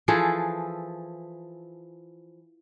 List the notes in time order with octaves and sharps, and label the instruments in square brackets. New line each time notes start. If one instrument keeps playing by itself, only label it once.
[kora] E3 F3 G#4 A4